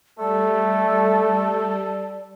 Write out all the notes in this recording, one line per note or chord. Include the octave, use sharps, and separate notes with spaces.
G3 A3 A4 D5